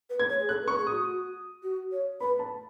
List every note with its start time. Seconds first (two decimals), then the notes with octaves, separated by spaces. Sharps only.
0.10 B4
0.20 G#6
0.29 C#5
0.40 G#4
0.48 A4 F#6
0.63 B4
0.68 C#6
0.77 G#4
0.87 F#4 D#6
1.63 F#4
1.92 C#5
2.20 B4 B5
2.39 A5